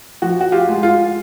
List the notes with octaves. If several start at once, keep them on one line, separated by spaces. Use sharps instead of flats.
F3 F#4
F#4
F4 G4
G#3
F4